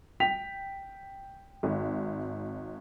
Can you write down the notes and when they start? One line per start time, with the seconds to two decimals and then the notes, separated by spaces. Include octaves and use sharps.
0.20 G5 B6 F7
1.63 G#1